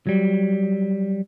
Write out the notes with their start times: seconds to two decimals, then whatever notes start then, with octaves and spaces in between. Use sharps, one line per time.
0.07 F#3 G3